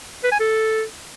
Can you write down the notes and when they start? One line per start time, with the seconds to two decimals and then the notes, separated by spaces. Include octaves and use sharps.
0.23 B4
0.32 G#5
0.40 A4